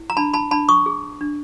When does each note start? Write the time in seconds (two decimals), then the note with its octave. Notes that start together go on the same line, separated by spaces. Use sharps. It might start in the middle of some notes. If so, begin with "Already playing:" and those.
Already playing: E4
0.10 A#5
0.17 D4 A5 B5
0.34 A5 B5
0.51 D4 A5 B5
0.69 C#6 D#6
0.86 G#4
1.21 D4